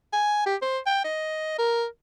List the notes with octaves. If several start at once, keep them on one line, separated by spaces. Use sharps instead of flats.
G#5
G4
C5
G5
D#5
A#4